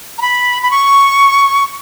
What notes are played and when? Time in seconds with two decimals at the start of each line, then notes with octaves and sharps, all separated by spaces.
0.18 A#5
0.21 B5
0.63 B5
0.71 C#6